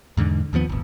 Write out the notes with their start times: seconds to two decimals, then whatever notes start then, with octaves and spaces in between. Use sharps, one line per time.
0.17 E2 G#2 D3
0.53 D#2 D#3 F3 B3
0.69 D#1 G#1